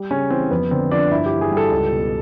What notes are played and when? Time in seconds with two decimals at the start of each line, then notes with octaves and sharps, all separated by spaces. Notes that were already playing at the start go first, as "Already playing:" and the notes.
Already playing: G3
0.11 C#3 C#4
0.30 E3 C4
0.51 F2 B3
0.71 D3 C4
0.91 F3 D4
1.11 G2 E4
1.26 G4
1.31 E3
1.41 G#4
1.51 G3
1.57 A4
1.72 C#2
1.91 B2